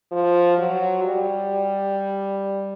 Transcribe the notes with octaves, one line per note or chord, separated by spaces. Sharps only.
F3
F#3
G3